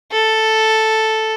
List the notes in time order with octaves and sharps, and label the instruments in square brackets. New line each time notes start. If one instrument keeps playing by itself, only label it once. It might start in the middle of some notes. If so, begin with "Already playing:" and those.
[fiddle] A4